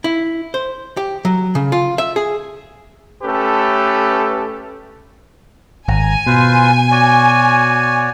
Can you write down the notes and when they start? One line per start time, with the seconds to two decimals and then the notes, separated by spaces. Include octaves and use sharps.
0.04 E4
0.54 C5
0.97 G4
1.25 F#3
1.55 C#3
1.72 F4
1.98 E5
2.16 G#4
3.23 A3 C#4 G4 A4 B4
5.88 G#1 G#5 A#5
6.26 B2 F4 B4 C5
6.91 F#4 C#5 D5